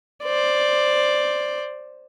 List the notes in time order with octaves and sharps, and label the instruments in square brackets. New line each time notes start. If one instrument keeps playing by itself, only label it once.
[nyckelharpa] C5 D5